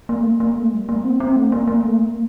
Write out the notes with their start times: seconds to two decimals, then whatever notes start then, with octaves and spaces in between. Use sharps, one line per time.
0.09 A#3
0.20 A3
0.25 A#3
0.40 A#3
0.57 A3
0.73 G3
0.89 A#3
1.04 C4
1.20 C4
1.36 A3
1.47 C4
1.52 A#3
1.67 A#3
1.84 A3
2.00 A#3